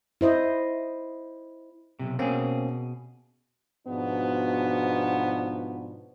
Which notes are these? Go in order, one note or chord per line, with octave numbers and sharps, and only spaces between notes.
E4 C5 D#5
B1 F#2 C3
B2 A#3 C4 C#4 G#4
G#2 B2 F3 B3 D4 F#4